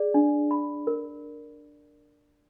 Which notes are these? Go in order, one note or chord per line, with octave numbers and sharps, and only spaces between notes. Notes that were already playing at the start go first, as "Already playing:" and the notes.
Already playing: G#4 D5
D4
B5
A#4